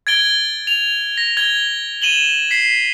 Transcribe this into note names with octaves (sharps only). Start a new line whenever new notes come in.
G#6 A6 D7 G7
F7
A#6
G#6 G7
D#7 E7 F#7 G7
B6 C7